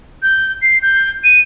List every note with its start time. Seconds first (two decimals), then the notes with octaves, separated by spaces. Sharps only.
0.23 G6
0.62 C7
0.83 G6
1.24 D#7